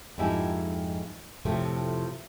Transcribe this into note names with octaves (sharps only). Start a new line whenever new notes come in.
F2 G#2 D#4 E4 G4 G#5
F2 A2 C3 F3 A3 C4